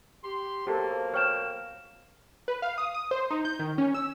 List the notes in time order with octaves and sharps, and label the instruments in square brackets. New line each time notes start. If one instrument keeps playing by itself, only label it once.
[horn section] G4 C6
[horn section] B2 F#3 A#3 [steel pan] G4 A4 [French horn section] C5
[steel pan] C#5 G5 [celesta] F6 E7
[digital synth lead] B4
F5
D#6
D#6
C5
D#4
G6
D#3
C#4
E6